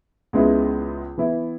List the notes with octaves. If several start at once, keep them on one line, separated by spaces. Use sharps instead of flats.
C#2 C#3 G#3 B3 E4
E3 B3 E4